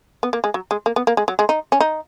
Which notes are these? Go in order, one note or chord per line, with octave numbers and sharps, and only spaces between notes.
B3
A#3
G#3
F#3
G#3
A#3
B3
A#3
G#3
F#3
G#3
D#4
C#4
D#4